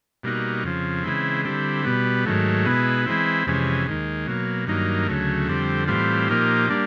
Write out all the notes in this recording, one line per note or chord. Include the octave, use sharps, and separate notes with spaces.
B2 G3 A#3 D#4 F#4
F2 C#3 F3
C#3 E3 G#3 C4 E4
D3 G3 C4 E4
B2 G3 B3
G#2 D#3 F#3 A3
B2 G#3 B3 E4
E3 G#3 C4 E4
F2 C3 E3 G#3 C#4
D#2 D#3 G#3
B2 F#3 A#3
G2 D#3 F#3 A#3 D#4
D2 C#3 F#3 A3
F2 D3 G3 C4
A2 E3 G3 C4 F4
A#2 F3 A#3 D#4 G4
G3 A#3 D4